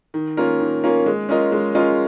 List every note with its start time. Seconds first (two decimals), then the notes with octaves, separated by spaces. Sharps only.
0.14 D#3
0.37 A#3 C#4 F4 A#4
0.60 D#3
0.84 A#3 C#4 F4 A#4
1.06 G#3
1.29 C#4 F4 A#4 D#5
1.52 G#3
1.75 C#4 F4 A#4 D#5